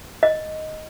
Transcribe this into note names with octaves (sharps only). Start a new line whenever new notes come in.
D#5